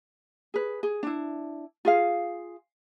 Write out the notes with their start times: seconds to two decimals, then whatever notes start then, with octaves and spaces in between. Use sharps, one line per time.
0.54 G#4 B4
0.83 G#4
1.03 D4 E4
1.85 F4 G#4 F5